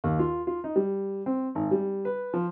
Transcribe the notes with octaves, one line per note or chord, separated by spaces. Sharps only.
D#2
F4
F4
D#4
G3
C4
G#1
G3
B4
F3